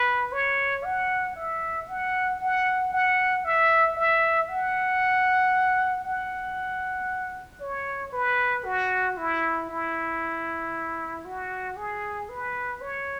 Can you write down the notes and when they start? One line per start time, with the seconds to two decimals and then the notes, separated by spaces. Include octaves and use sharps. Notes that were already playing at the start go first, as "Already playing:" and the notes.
Already playing: B4
0.33 C#5
0.84 F#5
1.36 E5
1.88 F#5
2.40 F#5
2.93 F#5
3.44 E5
3.97 E5
4.49 F#5
6.04 F#5
7.61 C#5
8.12 B4
8.65 F#4
9.17 E4
9.69 E4
11.25 F#4
11.77 G#4
12.29 B4
12.81 C#5